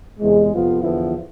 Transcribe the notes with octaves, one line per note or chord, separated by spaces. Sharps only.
E2 C3 G#3
F2 C3 F3 B3 F4
E2 D3 F3 B3 E4